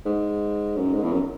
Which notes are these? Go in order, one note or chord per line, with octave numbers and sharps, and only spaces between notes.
G#2
F#2
G#2
E2
F#2